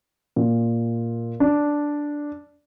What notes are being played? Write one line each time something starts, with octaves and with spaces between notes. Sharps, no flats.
A#2
D4